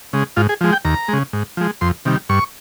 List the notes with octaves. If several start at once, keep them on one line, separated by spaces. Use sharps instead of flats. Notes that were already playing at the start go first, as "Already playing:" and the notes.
C#3 G#3
G#2 F4
G#4
F3 G#3
G5
D#2 A#5
C#3 G#3
G#2
F3 G#3
F2 C6
C3 D#3 G3
G2 C#6